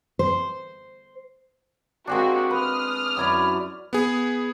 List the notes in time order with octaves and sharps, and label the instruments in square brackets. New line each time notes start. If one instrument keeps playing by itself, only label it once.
[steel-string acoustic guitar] C5
[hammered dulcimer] G#3 C4 D4 [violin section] A#3 F#4 G4
[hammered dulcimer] B4 [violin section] D#6 F6
[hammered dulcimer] F#2 E4 D5
[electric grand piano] B3 G#4